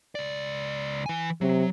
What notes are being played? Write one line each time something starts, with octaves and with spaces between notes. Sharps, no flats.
C#2 D5
E3 G#5
C3 F#3